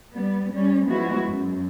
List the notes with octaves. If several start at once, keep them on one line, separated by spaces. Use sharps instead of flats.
G3 B3
G3 C#4
F3 G#3 B3 E4 F#4
F#2